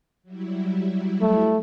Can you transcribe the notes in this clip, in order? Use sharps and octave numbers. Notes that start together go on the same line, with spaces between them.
F#3 G3 E4
A3